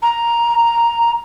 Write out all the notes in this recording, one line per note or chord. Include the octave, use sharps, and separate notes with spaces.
A#5